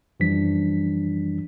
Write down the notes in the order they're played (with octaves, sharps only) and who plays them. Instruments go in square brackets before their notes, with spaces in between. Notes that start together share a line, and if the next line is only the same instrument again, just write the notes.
[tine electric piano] F#2 E3 F3 G3 D4 B6